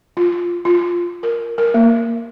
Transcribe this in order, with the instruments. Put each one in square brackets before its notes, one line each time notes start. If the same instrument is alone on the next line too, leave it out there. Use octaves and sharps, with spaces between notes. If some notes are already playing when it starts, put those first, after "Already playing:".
[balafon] F4
F4
A#4
A#4
A#3